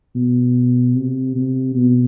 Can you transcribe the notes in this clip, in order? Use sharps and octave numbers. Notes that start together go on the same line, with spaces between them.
B2
C3
C3
B2